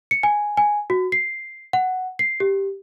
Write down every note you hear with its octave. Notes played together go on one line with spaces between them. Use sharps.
C#7
G#5
G#5
F#4
C7
F#5
C7
G4